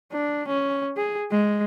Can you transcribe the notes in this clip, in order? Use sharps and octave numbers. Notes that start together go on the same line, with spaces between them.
D4
C#4
G#4
G#3